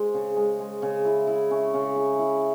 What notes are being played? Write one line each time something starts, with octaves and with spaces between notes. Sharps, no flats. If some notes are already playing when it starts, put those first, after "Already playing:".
Already playing: G#3 C5
C#3
G#3
G#3
C#3
E4
E4
C#4
C#3
E4
E4